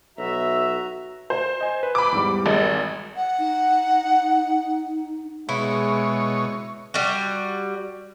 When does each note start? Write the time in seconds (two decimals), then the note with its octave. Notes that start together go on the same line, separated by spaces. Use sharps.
0.18 B1 F#4 E5 A#5
1.30 C5
1.61 D#5 G#5
1.83 B4
1.95 B5 D6
2.12 E2 G#2 G3
2.46 G#1 G#3
3.16 F#5
3.39 D#4
5.49 B2 G#3 E4 C#5
6.94 G3 F#4